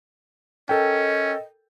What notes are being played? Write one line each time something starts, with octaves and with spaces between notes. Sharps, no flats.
C#4 A4 A#4 D#5 G5